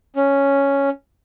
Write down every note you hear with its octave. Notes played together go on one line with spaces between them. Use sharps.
C#4